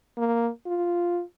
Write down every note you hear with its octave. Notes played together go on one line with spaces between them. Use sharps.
A#3
F4